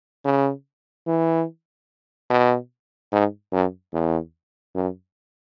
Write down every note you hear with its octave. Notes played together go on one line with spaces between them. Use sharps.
C#3
E3
B2
G#2
F#2
E2
F#2